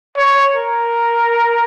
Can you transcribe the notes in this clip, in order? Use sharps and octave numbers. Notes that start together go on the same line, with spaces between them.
C#5
A#4